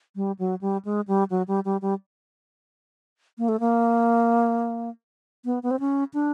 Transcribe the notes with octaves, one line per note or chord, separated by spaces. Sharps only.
G3
F#3
G3
G#3
G3
F#3
G3
G3
G3
A#3
A3
A#3
B3
B3
C4
C#4
D4